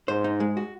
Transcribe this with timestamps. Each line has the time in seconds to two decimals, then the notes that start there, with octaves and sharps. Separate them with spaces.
0.08 G#2 C5
0.24 D#4
0.40 G#3
0.57 F#4